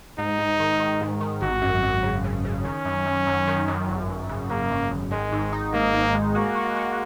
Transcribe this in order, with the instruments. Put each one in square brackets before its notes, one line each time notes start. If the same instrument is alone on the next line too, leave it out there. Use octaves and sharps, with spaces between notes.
[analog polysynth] G#2 [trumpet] D#4
[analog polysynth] G#2
D#3
D#3
G#2
D#3
[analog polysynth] G#1 [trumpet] F#4
[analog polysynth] F#2
F#2
C#3
C#3
C#3
[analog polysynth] D#3 [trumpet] C#4
[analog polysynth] F#2
F#2
F#2
D#3
F#2
G#1
G#1
C#3
[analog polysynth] C#3 [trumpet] A#3
[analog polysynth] F#2
G#1
[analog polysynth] D#3 [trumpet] G#3
[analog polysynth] G#2
D#4
[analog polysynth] G#2 [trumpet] A#3
[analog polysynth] G#2
G#3
[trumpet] A#3 [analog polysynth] F#4
[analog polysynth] F#4
F#4